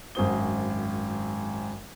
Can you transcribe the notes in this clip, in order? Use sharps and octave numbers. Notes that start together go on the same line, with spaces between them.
G#1 F#2 F#4 C5 D#6 G7